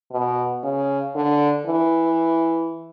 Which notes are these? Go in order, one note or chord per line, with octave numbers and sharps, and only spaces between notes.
B2
C#3
D3
E3